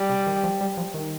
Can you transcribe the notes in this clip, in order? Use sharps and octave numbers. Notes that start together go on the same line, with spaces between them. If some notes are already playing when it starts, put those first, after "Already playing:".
Already playing: G3
C3
D#3
F3
G3
F3
D#3